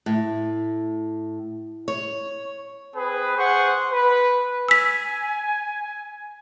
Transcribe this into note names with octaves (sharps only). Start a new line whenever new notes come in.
A2
C#5
C4 G#4 B4
G#4 C5 F#5 C6 C#6
B4
G#5 E6 B6